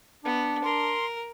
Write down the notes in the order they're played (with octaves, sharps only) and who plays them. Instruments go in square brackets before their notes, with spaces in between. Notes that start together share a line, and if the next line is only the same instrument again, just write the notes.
[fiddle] B3 [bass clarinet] D4
[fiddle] A#4 [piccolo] C6